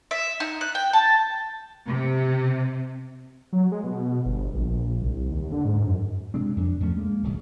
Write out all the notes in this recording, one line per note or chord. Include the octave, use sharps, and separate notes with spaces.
E5
D#4
F#6
G5
A5
C3
F#3
G#3
B2
G1
A#1
C2
D#2
D3
G#2
F#2
C3 G#3 C4 D4
F2 D4
E2 F3 A3 C#4
G#3 A#3
D1 C2 D#3